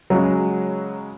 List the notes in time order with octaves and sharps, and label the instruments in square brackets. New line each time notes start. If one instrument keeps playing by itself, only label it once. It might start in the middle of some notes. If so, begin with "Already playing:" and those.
[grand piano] C#3 G#3 F#4 [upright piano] F#3